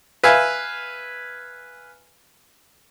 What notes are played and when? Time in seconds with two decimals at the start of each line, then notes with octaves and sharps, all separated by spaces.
0.24 B4 E5 F5 G#5